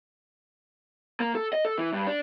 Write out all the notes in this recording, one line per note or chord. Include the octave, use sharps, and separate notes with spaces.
A#3
A4
D#5
A4
E3
G2
D4